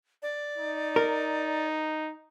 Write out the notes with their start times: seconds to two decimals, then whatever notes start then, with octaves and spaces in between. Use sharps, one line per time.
0.23 D5
0.58 D#4
0.96 A#4